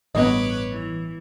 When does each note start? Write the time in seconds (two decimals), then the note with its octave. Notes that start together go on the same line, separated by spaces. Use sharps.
0.15 A1 G2 G3 B3 B4 C#5 D#5 D6
0.70 E3